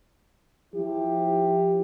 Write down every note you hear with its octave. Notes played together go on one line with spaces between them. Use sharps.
F3 E4 G4